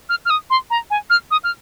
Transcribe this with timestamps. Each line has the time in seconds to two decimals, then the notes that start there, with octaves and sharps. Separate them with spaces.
0.09 F6
0.25 F6
0.30 D#6
0.50 C6
0.70 A#5
0.90 G#5
1.10 F6
1.31 D#6
1.44 F6